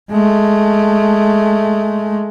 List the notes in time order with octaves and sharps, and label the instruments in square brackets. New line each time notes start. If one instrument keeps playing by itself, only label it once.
[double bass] G#3 A3